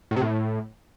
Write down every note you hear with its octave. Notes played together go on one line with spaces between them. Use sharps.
A2
C3
A2